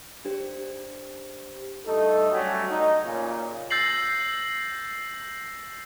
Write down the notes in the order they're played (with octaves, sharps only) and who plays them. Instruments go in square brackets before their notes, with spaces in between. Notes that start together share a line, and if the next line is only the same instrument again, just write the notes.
[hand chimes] D4 G4 C5
[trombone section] G2 A3 D#4 A4
F#3 G3 A3 C#4 F#4
D#4
A#2 C#3
[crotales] E6 G6 A6 A#6 C7 F#7